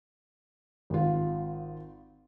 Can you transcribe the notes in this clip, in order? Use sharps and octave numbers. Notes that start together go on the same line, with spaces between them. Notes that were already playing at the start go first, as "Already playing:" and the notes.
G#1 F4